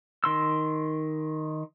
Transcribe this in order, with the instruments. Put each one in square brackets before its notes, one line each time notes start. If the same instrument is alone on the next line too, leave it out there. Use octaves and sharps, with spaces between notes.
[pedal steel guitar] D#3 C6 E6